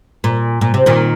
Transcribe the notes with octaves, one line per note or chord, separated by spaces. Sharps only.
A#2
A#2
C3
A#2 D#3